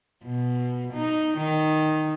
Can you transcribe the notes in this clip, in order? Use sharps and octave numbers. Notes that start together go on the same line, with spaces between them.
B2
D#4
D#3